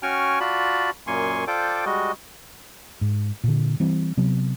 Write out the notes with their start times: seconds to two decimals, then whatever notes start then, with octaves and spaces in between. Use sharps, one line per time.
0.03 C#4 F#4 G5 G#5 C#6 F6
0.40 F4 F#4 D5 A5 B5
1.07 F#2 A#2 A#3 G#5 C6 C#6
1.47 F4 A4 C5 D5 G5 D6
1.85 G3 G#3 F#4 D#5
3.01 G#2
3.44 A#2 D3
3.80 E3 G3 C4
4.17 C3 F#3 B3